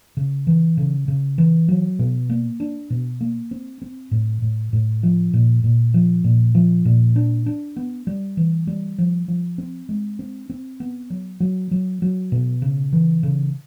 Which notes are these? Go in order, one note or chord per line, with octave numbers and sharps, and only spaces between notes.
C#3
E3
C#3
C#3
E3
F#3
B2
A#3
D4
B2
A#3
C4
C4
A2
A2
A2
F3
A#2
A#2
F3
A#2
F3
A#2
D4
D4
B3
G3
E3
G3
F3
F3
C4
G#3
C4
C4
B3
F#3
F#3
F#3
F#3
B2
C#3
E3
C#3